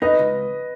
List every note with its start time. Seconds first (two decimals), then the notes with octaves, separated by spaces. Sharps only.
0.02 D#4 B4 D#5
0.19 C#2